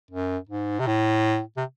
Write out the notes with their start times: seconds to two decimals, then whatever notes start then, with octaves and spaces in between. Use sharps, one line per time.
0.11 F#2
0.49 G#2
0.79 C3
0.87 A2
1.57 C3